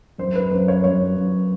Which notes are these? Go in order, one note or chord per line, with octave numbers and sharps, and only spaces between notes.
F#2 C5
B4
F#2 C5
C#5
F#2 C#5
F#2